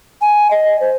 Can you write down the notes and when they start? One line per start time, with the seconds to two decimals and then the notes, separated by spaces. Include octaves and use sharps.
0.21 G#5
0.51 D#5
0.81 C5